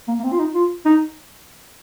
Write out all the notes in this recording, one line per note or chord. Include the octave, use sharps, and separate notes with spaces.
A#3
A#3
C4
F4
D#4
F4
D#4